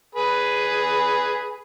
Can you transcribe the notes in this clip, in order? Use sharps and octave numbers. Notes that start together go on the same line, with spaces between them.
G#4 B4 B5